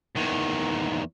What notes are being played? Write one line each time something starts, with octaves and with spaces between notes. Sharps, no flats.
E2 D#3